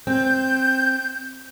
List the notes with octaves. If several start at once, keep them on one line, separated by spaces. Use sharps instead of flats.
C4 G6